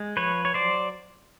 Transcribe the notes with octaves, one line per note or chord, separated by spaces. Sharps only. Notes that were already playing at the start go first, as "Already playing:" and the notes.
Already playing: G#3
F3 B4 C#5
C#5
F#3 C5 D5